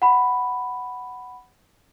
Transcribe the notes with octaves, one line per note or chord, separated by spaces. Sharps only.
F#5 B5